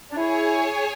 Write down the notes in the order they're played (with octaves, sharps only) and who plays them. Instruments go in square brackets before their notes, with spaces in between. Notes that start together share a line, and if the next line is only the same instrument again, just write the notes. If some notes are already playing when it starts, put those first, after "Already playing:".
[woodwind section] D4
[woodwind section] E4 [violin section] G#4 C#5 G#5